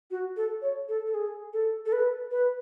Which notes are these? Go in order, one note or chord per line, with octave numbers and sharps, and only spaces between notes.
F#4
A4
C#5
A4
A4
G#4
A4
A4
B4
B4